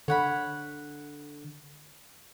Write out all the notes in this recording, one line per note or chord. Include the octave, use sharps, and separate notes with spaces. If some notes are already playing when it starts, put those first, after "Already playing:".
D3 C#5 F#5 B5